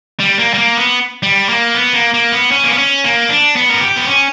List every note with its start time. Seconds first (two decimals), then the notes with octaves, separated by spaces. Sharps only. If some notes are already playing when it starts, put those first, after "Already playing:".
0.20 G3
0.39 A#3
0.54 G3
0.58 A#3
0.77 B3
1.23 G3
1.49 A#3
1.74 B3
1.94 A#3
2.14 A#3
2.32 B3
2.51 C#4
2.64 A#3
2.71 B3
2.78 C#4
3.04 A#3
3.29 D4
3.56 B3
3.69 A#4
3.81 G4
3.96 B3
4.07 C#4